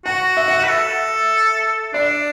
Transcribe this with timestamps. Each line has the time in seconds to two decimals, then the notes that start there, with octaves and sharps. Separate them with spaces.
0.05 F#4 F#5
0.37 E5
0.48 F#5
0.60 B4 E5
0.69 A4
1.94 D4 D5